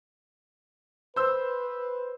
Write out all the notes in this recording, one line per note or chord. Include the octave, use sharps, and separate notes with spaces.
B4 C5 E6